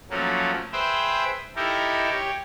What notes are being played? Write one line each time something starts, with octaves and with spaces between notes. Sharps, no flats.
F3 F#3 A3 A#3 C#4
G#4 B4 C5 E5 G5
D#4 E4 G4 A4 A#4
G4 C#5